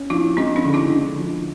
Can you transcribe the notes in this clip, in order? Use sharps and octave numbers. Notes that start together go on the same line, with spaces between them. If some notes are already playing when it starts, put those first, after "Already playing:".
Already playing: C#4
F3 D4 E4
G#3 C4 D4
C#4 D#4
D3
D4 E4
D3
F3